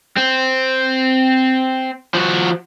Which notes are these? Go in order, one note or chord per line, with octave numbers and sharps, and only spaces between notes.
C4
F3 F#4